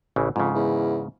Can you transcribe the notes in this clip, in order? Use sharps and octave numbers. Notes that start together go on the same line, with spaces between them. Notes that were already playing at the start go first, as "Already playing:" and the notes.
A1 C#3 E3
F2 G#2 C#3
E2